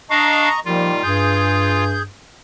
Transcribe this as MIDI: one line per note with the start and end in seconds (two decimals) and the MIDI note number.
0.10 0.49 62
0.10 0.60 75
0.10 0.49 77
0.10 0.60 82
0.10 0.60 85
0.65 1.02 46
0.65 1.02 51
0.65 0.91 53
0.65 1.02 55
0.65 1.84 65
1.03 2.09 43
1.03 2.03 68
1.03 2.03 91